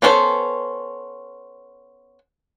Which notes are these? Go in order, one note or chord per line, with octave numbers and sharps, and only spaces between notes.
B3 C#4 D4 A4 C5